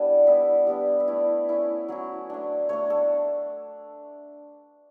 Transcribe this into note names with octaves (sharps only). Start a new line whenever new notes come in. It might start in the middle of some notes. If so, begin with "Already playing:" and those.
Already playing: G3 B3 D4 E4
G3 B3 E4 E5
G3 B3 D4
E5
A3 E4 D5
A3 C#4 E4
F#3 C#4 E4
A3 D4
A3 D4 C#5
A4